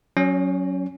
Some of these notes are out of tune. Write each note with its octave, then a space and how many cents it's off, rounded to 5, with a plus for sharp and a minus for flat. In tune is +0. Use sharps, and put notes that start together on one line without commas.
F#3 +0 C#4 +0 C#5 +45